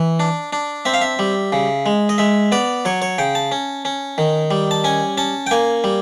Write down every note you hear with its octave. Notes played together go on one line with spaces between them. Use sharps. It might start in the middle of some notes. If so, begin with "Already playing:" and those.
Already playing: E3
D4
D4
C4 E5
F5
E5
G3
C#3
G#3
D#5
G#3 E5
B3 D5
F#3 C#5
C#5
C#3 G5
A5
C#4
C#4
D#3
G3
A5
C#4 G#5
C#4 A5
G5
A#3 G#5
G3